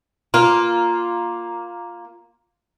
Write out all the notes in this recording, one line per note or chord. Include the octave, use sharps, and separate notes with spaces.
A#3 F4